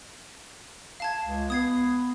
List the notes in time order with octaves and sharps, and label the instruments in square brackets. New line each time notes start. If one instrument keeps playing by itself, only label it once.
[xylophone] F5 A5 G#6
[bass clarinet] C#2
[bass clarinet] B3 [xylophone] D#6 G#6 C7